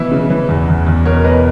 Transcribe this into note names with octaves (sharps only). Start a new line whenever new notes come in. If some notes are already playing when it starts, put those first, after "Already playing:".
Already playing: B2 E3 E4
C#3
E3
E2
E2
E2
B2 A#4 C#5
B2 B4 D#5